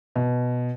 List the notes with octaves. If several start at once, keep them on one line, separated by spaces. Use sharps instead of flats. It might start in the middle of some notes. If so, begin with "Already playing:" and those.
B2